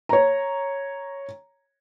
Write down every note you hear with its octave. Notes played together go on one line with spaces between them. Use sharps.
C#5 A#5